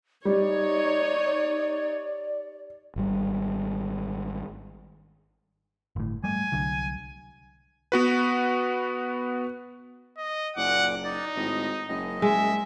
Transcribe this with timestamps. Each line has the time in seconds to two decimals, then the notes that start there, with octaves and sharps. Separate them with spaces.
0.25 G3 D#4 C#5 D5
2.96 G#1 G3
5.96 G1 A2
6.24 G3 A3 G#5
6.52 C2 D3 F#3
7.92 B3 F#4 B4
10.17 D#5
10.56 F#1 A#2 F#5 D6
11.04 D#4 D5
11.36 G#1 A2 D#5
11.89 F#1 F#2 D#5
12.22 G#3 E5